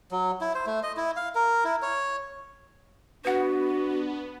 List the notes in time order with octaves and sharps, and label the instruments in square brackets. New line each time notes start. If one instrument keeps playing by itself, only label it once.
[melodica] F#3
E4
C5
A3
D#5
E4
F5
A#4
E4
C#5
[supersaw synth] B3 [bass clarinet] D4 [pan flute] F#4 [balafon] B4 F#5